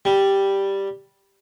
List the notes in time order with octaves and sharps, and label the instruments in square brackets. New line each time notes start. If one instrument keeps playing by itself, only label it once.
[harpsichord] G3